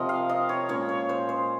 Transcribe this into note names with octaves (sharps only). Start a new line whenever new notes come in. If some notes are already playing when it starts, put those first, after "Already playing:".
Already playing: C3 F3 C4 A#4 D#5
F5
D#5
C#5
A#2 G#3 C#4 C#5
C#5
C5
C5